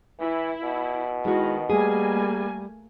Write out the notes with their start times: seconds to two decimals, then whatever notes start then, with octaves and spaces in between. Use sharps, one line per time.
0.19 E3 E4
0.63 B2
1.25 D#3 G#3 E4 F#4
1.69 G3 A3 A#3 G#4 G#5